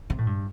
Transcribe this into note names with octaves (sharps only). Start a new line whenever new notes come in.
C3
A2
G2